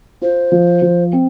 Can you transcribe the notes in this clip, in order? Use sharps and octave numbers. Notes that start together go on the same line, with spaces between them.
F4 C5
F3
F3
C4